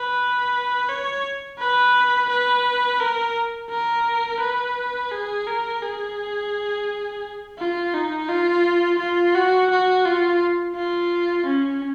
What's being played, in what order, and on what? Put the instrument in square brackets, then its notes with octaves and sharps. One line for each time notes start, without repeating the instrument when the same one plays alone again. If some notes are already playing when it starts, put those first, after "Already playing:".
Already playing: [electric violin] B4
C#5
B4
B4
A#4
A#4
B4
G#4
A#4
G#4
F4
D#4
F4
F4
F#4
F#4
F4
F4
C#4